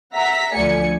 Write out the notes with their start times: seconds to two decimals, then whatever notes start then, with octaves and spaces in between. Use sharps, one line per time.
0.15 E5 F#5 A#5 B6
0.55 D2 F3 A3 D5 G#5 C#7